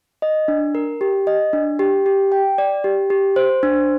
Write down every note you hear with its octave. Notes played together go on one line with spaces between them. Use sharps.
D#5
D4
A#4
G4
D#5
D4
G4
G4
G5
D5
G4
G4
C5
D4